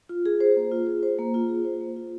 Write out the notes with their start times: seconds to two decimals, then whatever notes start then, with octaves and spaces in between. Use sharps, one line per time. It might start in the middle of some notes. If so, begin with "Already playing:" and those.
0.09 F4
0.26 G#4
0.40 C5
0.57 A#3
0.71 F4
0.87 G#4
1.03 C5
1.19 A#3
1.34 F4
1.49 G#4
1.65 C5
1.81 A#3
1.96 F4